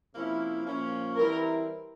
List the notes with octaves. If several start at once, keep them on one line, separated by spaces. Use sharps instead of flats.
C3 F3 A#3 C#4 E4
A#2 F3 A#3 C#4
E3 G3 C4 E4 A#4